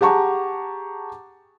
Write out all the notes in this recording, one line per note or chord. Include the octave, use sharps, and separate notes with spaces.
G4 G#4 F#5 A5 A#5 C#6